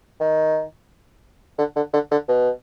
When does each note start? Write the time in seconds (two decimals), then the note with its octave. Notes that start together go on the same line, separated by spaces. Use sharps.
0.20 D#3
1.58 D3
1.76 D3
1.93 D3
2.11 D3
2.28 B2